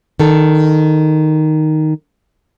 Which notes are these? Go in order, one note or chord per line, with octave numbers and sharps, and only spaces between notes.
D#3 A4